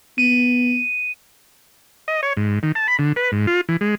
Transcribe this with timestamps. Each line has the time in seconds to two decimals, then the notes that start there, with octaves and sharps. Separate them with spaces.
0.18 B3 D#7
2.08 D#5
2.23 C#5
2.37 G#2
2.63 D#3
2.75 A5
2.88 B5
2.99 D3
3.16 B4
3.32 G#2
3.47 F4
3.69 E3
3.81 G#3